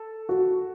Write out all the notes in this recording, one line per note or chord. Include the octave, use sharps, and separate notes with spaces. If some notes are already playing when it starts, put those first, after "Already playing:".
Already playing: A4
F#4